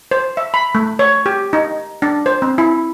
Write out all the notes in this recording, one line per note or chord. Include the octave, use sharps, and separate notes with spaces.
C5
E5
B5
A3
C#5
G4
D#4
D4
C5
C4
E4